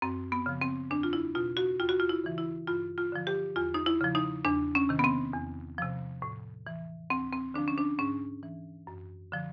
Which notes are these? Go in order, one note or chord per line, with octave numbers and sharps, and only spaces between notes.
F#2 C4
B3
C#3 F3
C4
E2 D4
F4
E4
B2 F4
F#4
D#2 F4
F#4
F4
E4
C#3 E3
E4
G2 F4
F4
D3 F3
G4
E2 F4
D#4
E4
C#3 F3
D#4
E2 D4
C#4
C3 D#3
B3
C4
E2
C3 F3
A2
E3
D2 C4
C4
D3 F3 D4
C#4
D4
G#2 C#4
E3
F#2
D3 F3